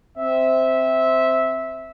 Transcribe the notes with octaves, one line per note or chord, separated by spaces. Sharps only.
C4 E5